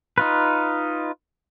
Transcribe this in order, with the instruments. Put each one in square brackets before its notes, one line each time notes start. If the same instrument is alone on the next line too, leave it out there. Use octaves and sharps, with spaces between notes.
[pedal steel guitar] D#4 F4 B4